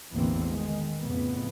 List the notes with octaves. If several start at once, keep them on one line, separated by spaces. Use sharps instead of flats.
A1 E2 D3 E3 A#3 C4
D#3 G#3
F2 A2 C#3 B3